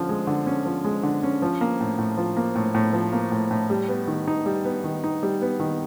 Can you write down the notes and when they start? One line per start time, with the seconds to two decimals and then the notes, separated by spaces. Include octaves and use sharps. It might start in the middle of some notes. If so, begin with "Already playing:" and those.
Already playing: D3 F3 C#4
0.09 G#3
0.27 D3
0.47 C#4
0.66 F3
0.85 G#3
1.03 D3
1.23 C#4
1.42 F3
1.61 A#3
1.80 A2
1.98 A2
2.17 F3
2.37 A#3
2.55 A2
2.75 A2
2.93 F3
3.13 A#3
3.32 A2
3.51 A2
3.70 G3
3.88 B3
4.07 D#3
4.27 D#4
4.46 G3
4.65 B3
4.84 D#3
5.04 D#4
5.23 G3
5.42 B3
5.60 D#3